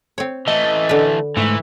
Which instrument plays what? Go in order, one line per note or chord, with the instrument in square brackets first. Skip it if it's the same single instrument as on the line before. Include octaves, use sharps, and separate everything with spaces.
[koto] C4 C#5
[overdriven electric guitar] E3 A3 [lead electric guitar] D#5
[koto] D3 B4
[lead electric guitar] G#2 A3 [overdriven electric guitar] E3